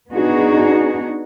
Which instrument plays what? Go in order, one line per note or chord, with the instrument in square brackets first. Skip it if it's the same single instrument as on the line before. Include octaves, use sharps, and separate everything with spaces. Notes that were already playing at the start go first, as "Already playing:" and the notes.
[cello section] B3 D4 D#4 F#4 G#4